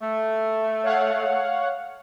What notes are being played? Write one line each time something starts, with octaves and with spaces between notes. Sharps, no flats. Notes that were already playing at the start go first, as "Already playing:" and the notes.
A3
C#5 F5 F#5